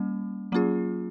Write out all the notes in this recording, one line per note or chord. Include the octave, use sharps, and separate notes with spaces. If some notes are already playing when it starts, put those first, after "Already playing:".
Already playing: G3 A#3 C#4
F#3 A#3 C#4 F4 G#4